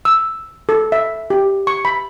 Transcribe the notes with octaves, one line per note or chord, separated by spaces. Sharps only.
E6
A4
E5
G4
C#6
B5